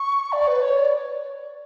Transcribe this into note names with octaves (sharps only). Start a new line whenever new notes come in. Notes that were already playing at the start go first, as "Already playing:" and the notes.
Already playing: C#6
D5
B4
C#5
D5